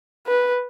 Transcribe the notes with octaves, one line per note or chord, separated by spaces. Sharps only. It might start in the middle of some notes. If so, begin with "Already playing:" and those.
B4